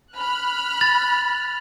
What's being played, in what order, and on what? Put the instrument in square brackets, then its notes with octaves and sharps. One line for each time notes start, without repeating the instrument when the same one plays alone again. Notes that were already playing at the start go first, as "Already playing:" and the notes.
[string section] B5 F6 F#6
[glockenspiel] A6